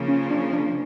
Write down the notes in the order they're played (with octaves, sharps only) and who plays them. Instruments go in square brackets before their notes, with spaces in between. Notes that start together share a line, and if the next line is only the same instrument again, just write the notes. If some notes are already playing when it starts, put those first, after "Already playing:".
Already playing: [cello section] C#3 F3 A#3
[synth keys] C#4
D4
D4